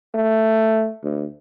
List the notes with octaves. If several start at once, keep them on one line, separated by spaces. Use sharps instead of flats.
A3
D2